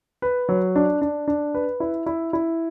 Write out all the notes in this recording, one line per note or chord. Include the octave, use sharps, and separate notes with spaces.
B4
F#3
D4
D4
D4
B4
E4
E4
E4